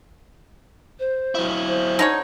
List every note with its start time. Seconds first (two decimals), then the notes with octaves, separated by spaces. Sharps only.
0.99 C5
1.35 F#3 E4
1.67 C5
1.99 D3 C#4 D#4 C#5